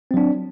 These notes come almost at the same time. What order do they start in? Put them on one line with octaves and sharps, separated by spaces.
C4 F#3 D4